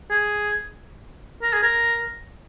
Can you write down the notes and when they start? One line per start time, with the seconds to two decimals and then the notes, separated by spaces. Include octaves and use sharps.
0.10 G#4
1.43 A#4
1.53 G#4
1.63 A#4